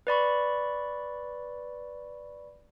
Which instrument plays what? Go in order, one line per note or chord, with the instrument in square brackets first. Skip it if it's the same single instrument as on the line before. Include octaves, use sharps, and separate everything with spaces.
[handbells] B4 D5 B5 C#6